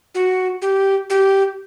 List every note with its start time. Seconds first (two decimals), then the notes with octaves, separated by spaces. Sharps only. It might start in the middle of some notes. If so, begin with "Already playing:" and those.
0.15 F#4
0.62 G4
1.10 G4